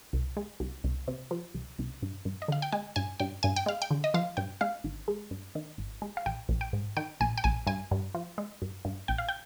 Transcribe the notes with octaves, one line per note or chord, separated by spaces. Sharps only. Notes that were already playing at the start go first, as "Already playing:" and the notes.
C2
G#3
C2
C2
C3
F3
C2
C2
G2
G2
D#5
D3 F5
G5
G#3 G#5
G2 G#5
G2 G5
G2 G#5
G5
G#3 F5
G5
D3
D#5
F3 F5
G2 G5
G#3 F5
G#1
G#3
G2
D#3
G#1
G#3
F5
A#1 G5
A#1
G5
G#2
D#3 G5
A#1 G#5
G5
A#1 G#5
G2 G#5
G2
F3
G#3
G2
G2
A#1 G5
F5
G5